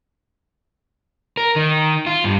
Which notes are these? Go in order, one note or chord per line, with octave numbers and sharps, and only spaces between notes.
A#4
D#3
F4
G2